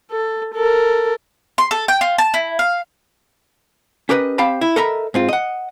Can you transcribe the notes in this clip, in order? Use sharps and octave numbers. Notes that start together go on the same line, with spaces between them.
A4
A4 A#4
C6
A4
G5
F4
A5
E4
F5
C#4 G4 A#4 B4 D#5
C4 G4 F5 G5 A5 B5
E4
A4 A#4 D#5 E5 A#5 B5
G#2 C4 F4
D#5 F#5